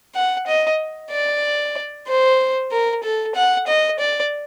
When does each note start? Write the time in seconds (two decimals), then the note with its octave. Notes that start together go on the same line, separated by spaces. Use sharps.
0.15 F#5
0.47 D#5
1.11 D5
2.07 C5
2.71 A#4
3.03 A4
3.35 F#5
3.67 D#5
3.99 D5